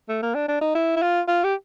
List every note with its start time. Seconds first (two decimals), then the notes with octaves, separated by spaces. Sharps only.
0.09 A3
0.23 A#3
0.35 D4
0.48 D4
0.61 D#4
0.75 E4
0.97 E4
1.02 F4
1.28 F4
1.44 G4